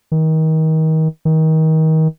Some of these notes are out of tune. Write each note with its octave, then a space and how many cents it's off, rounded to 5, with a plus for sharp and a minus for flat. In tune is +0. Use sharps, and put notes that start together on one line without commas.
D#3 +30
D#3 +30